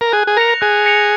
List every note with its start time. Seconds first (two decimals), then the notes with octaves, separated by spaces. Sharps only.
0.01 A#4
0.12 G#4 F#6
0.27 G#4
0.37 A#4 A#6 C#7 F7
0.61 G#4 F#6
0.86 A#6 C#7 F7